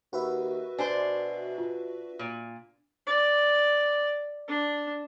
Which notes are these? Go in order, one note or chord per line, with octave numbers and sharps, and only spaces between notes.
D#2 F#4 B4 E5
B2 D4 C5 G#5
F4
A#2
D5
D4